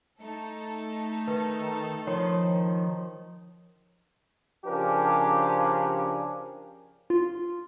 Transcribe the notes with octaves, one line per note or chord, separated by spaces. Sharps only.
A3 D#4 A4
D#3 B4
D#3 F3 C#5
C#3 F3 C#4 D4 G4 A#4
F4